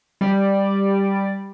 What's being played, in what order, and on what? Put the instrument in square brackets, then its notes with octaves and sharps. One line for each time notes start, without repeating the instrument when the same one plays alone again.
[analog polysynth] G3 D5